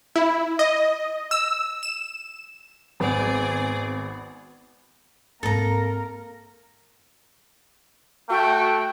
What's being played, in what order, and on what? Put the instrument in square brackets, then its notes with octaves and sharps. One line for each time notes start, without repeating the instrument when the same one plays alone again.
[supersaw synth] E4
D#5
E6
E7
[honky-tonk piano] G#1 [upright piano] B3 [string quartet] G#4 D5
[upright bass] G#2 C4 [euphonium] A#3 [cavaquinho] A4 A#5 [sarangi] A#4
[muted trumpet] A3 [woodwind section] F#4 G5